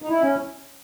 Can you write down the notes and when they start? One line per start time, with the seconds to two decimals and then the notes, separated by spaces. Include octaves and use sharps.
0.02 D#4
0.09 E4
0.21 C#4